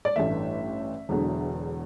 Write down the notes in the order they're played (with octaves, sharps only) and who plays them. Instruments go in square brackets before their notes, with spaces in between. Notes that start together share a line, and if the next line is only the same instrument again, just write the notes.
[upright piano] D5
A1 G2 E3 A3 E5
E1 E2 D3 F#3